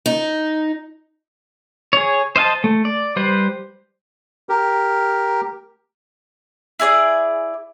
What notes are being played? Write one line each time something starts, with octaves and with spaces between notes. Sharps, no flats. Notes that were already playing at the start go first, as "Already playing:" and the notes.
D#4
G#4 C#5
C5 D#5 F5 A5
A3
D5
G3 B4 C5
G4 A#4
E4 G#4 C#5 D5